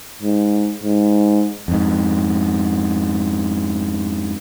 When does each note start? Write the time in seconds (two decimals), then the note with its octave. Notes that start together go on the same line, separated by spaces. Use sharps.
0.22 G#2
0.83 G#2
1.68 F2 G#2